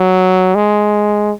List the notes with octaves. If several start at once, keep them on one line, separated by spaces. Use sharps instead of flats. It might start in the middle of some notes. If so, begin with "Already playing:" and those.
Already playing: F#3
G#3